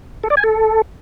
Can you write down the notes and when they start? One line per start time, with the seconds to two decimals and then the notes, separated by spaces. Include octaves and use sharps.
0.24 A4
0.30 D5
0.37 G#5
0.44 A4